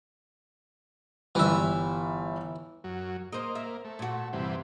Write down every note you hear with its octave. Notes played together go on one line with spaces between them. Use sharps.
G1 E3 G3 E5
F#2 F#3
A#3 C5 D#5
E5
A3
A#2 F#4
G2 C3 E3